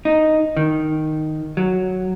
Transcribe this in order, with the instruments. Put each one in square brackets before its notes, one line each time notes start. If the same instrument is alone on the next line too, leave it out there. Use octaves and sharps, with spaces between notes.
[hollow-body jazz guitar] D#4
D#3
F#3